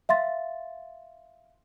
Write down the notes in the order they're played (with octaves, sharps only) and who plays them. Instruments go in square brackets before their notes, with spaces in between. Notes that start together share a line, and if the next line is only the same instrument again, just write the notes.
[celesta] E5 F5 C6 A6